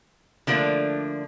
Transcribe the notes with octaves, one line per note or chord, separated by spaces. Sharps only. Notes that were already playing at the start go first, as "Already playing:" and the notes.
D3 F3 A3 A#3 D4